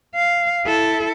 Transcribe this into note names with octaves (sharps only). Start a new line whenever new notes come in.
F5
E4 A4